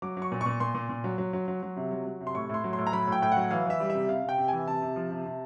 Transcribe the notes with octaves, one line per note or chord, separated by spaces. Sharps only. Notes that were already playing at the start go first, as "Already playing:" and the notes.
F#3 D6
F#3
C#6
A#2
C#6
A#2
A#2 C6
A#2
A#2
F#3
F#3
F#3
F#3
F#3
C3
F#3
F#3
C3
C6
A2 C#6
A2 C6
F#3
C6
A2
A#5
F#3 B5
A2 G5
A2 G5
F#3 F#5
E3 F5
E3 E5
G3
C3 E5
C3 F5
C3
G5
C3
E3 G#5
C3 A5
C3
F3
C3
C3